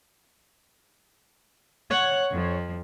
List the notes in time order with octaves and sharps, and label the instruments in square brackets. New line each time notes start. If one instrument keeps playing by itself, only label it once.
[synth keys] C#5 [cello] F#5
[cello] F2 F3